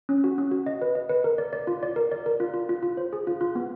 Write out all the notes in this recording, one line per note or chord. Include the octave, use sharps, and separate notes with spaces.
C#4
F#4
C#4
F#4
D#5
B4
D#5
B4
A#4
D5
D5
F4
D5
A#4
D5
A#4
F4
F4
F4
F4
C5
G#4
F4
F4
B3